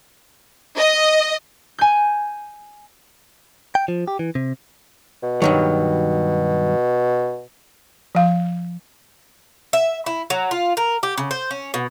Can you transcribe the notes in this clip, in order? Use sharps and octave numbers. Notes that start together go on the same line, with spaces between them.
D#5
G#5 G6
G5
F3
G4
E3
C3
B2
G2 B2 D#3 F#3
F3 F5
E5
E4
F#3
F4
A#4
G4
C#3
C5
C#4
B2